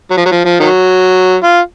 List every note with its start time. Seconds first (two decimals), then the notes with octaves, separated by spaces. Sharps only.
0.11 F#3
0.17 F3
0.25 F#3
0.31 F3
0.45 F3
0.60 D#3 F#3
1.43 F4